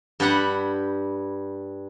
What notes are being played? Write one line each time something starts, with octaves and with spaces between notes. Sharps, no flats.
G2 G4 F#5 B5